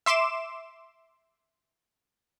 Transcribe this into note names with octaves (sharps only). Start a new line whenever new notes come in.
E5 C6 D6 E7